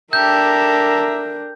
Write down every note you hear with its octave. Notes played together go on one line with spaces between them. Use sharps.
D4 G4 A4 A#4 E5 A#5 G6